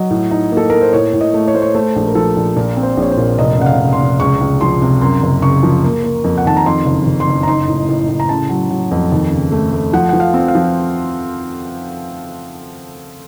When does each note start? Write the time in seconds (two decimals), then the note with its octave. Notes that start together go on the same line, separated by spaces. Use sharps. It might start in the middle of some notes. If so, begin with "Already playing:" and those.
Already playing: F#3 D#5
0.10 A2
0.31 D#4
0.52 A#3 A4
0.70 A#3 A#4
0.82 C5
0.93 A2 C#5
1.13 A2
1.21 D#5
1.34 A3
1.48 C#5
1.54 A3 C5
1.62 C#5
1.75 A3 C5
1.96 A#1
2.07 A#4
2.15 F3 A4
2.36 A#1
2.56 A#2 A#4
2.77 C4
2.83 C5
2.97 A#1
3.02 C#5
3.12 C5
3.17 A#2
3.38 F1 D#5
3.59 C#3 F#5
3.66 F5
3.79 C#3
3.93 C6
4.00 F1
4.20 C#2 C#6
4.41 C#2
4.61 F3 C6
4.82 C3
5.01 F#2 C6
5.23 F#1
5.42 C#3 C#6
5.63 F3
5.84 A#3
6.04 A#3
6.24 F2
6.38 F#5
6.45 D#3 A5
6.57 A#5
6.66 F2 C6
6.86 F#1
7.07 F#1
7.20 C6
7.27 F#1
7.43 A#5
7.47 D#4 C6
7.67 A2
7.89 A2
8.09 A2
8.20 A#5
8.29 C#3 A5
8.50 F#3
8.70 F#3
8.91 F2
9.12 D#2
9.32 C#3
9.52 A3
9.73 A3
9.93 F3 F#5
10.09 F3 F#5
10.20 F5
10.34 C4
10.48 F5
10.55 F3